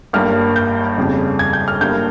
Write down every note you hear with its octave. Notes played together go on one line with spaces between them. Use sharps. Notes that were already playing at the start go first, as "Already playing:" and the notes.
G1 G2 G3 A#3 F6
G6
G1 F2 C#3 G3
G#6
G6
F6
G1 G2 G3 A#3 G6